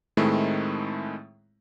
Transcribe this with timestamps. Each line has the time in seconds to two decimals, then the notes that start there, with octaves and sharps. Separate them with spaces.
0.17 A2 D#3 G#3 A3 C4 E4